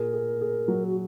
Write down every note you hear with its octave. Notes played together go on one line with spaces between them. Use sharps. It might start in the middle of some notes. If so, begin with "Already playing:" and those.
Already playing: A#2 G#4 A#4
G#4
G#4
F#3
F#4